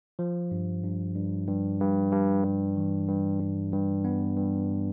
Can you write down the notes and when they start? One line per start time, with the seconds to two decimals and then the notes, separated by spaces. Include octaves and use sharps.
0.19 F3
0.51 G2
0.83 G2
1.16 G2
1.48 G2
1.80 G2
2.12 G2
2.44 G2
2.76 E3
3.08 G2
3.40 G2
3.72 G2
4.05 B3
4.37 G2